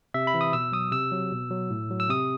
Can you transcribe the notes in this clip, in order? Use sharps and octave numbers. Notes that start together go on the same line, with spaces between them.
C3 E5
B5
E3
D#6
B2 E6
F#3 D#6
C3 E6
F#3
B2
F#3
A2
F#3
E6
C3 D#6